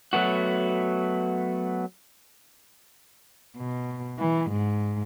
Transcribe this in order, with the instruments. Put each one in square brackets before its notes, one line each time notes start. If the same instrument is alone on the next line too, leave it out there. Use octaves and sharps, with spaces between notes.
[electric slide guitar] F#3 A3 B3 F#4
[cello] B2
E3
G#2